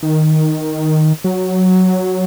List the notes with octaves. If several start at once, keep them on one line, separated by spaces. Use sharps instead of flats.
D#3
F#3